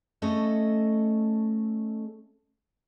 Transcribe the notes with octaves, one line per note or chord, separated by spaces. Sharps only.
A3 C#4 A4 D#5